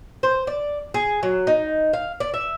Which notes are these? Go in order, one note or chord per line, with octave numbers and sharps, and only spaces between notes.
C5
D5
G#4
F#3
D#4
F5
D5
E5